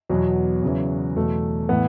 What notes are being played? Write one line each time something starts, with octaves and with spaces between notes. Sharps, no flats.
E2 B2 F#3
E2 C#3 E3
E2 B2 A3
A2 E3 B3